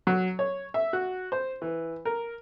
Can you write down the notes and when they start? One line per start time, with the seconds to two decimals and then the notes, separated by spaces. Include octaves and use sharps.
0.07 F#3
0.39 C#5
0.74 E5
0.93 F#4
1.32 C5
1.62 E3
2.05 A#4